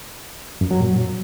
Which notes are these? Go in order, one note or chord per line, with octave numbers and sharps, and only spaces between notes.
F#2
F#3
A#2